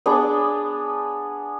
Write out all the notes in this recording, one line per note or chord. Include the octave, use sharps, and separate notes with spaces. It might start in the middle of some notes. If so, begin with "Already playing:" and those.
B3 D4 G#4 D6